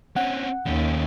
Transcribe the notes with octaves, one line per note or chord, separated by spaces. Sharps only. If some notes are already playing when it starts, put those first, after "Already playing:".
C4 C#4 F#5
D#2 D#3 C#4